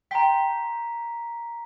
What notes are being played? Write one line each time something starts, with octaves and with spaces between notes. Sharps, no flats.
G5 A5 A#5 C6 B6